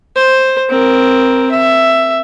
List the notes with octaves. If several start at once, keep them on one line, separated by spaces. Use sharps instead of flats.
C5
C4 A#4
E5